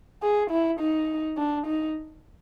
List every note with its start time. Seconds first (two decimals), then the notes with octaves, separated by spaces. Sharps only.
0.23 G#4
0.50 E4
0.80 D#4
1.37 D4
1.66 D#4